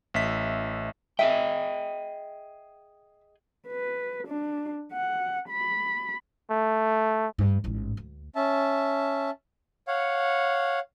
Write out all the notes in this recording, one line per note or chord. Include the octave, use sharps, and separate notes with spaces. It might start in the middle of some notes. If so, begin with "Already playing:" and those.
A1 E5 B6
G#4 D#5 E5 G5
B4
D4
F#5
B5
A3
G2
A1 G#2
D2
C#4 E5 A5
C#5 F5 F#5